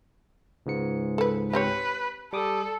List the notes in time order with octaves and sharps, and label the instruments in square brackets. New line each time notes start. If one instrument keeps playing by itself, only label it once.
[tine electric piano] C#2 G#2 C#7
[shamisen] A4 B4
[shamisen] C4 G4 C#5 [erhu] B4
[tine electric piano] G3 D6 D#6 [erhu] A4